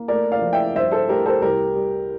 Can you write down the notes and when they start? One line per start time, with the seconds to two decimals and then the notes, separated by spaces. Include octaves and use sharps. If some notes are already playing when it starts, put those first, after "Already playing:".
Already playing: A#3
0.08 A3 A#4 D5
0.32 D5 F5
0.42 F3
0.53 E5 G5
0.75 G2 C5 E5
0.91 A4 C5
1.08 A3 G4 A#4
1.26 A4 C5
1.41 C2 G4 A#4
1.76 G3